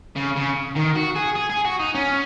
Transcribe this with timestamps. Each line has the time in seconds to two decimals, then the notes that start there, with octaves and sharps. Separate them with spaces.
0.16 C#3
0.36 C#3
0.75 D#3
0.95 F#4
1.16 G#4
1.35 G#4
1.50 G#4
1.65 F#4
1.80 D#4
1.95 C#4